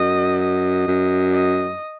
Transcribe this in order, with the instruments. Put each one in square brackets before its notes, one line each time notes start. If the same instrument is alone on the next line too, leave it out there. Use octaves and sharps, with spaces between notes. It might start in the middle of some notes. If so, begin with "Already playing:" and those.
Already playing: [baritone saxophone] F#2 [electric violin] D#5
[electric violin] D#5
[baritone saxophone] F#2
[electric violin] D#5